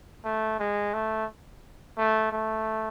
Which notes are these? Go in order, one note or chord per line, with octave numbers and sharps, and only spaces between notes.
A3
G#3
A3
A3
A3